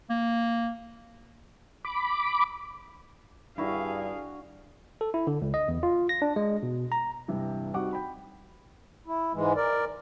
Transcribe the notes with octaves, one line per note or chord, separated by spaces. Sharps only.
A#3
B5 D6
G2 D4 E4 F#4 G#4 F5
A4
E4
D3
C#2
D#5
E2
F4
A#6
D4
G#3
B2
A#5
G2 C3 E3 G3
G3 C4 D#4 F#4 F#5 D6
G5 B5
E4
G#2 E3 G#3
A#4 D5